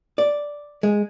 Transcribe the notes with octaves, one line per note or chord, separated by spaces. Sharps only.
D5
G#3